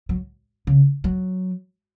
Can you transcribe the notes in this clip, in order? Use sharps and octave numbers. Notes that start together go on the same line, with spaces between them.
F#3
C#3
F#3